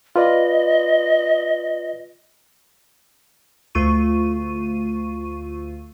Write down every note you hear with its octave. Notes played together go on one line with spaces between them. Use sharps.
F4 B4 D5 D#5
D2 A3 F4 C#6 D#7